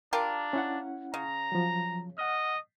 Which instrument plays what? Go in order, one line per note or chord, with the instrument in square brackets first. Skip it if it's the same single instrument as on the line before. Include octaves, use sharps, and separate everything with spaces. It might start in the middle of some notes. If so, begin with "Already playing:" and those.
[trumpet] D4 [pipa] F4 G4 A#4 [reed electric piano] A5
[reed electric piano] C#4 E4 F#5
[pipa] C#3 [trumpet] A#5
[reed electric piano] F3 F#3
[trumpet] D#5 [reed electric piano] F#5 F6